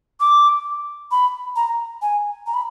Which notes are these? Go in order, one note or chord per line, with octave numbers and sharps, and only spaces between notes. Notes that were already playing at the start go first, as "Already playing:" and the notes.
D6
B5
A#5
G#5
A#5
B5